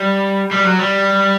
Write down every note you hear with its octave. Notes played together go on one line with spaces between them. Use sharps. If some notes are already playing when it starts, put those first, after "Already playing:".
Already playing: G3
G3
F#3
G3